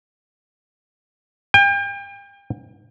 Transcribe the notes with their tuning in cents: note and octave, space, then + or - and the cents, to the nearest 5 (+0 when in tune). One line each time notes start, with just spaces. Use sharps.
G5 +35